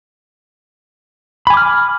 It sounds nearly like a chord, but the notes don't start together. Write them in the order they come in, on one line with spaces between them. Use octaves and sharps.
B5 G#5 D6 F6